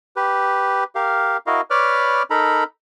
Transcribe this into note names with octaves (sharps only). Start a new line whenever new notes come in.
G4 B4
G4 A#4 F5
E4 F#4 A#4 D#5 F5
B4 C#5 D5 B5 D6 F6
D#4 A4 A#4 A#5 B5